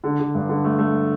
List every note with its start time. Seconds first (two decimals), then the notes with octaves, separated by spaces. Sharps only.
0.04 D3
0.20 D3
0.35 G2
0.49 D3
0.64 A3
0.79 A3